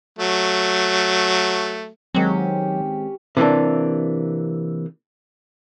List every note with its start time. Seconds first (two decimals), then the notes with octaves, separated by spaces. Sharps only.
0.19 F#3 A3
2.15 D#3 F#3 G#3 C4 C#4 G4
3.37 C3 E3 A#3 D4